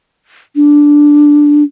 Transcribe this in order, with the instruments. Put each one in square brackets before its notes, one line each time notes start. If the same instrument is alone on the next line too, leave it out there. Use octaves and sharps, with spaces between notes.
[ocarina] D4